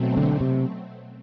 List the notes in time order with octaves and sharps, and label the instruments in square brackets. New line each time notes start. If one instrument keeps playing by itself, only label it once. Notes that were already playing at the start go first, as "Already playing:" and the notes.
Already playing: [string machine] B2 F#3 A3 C4
[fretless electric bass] D3
C3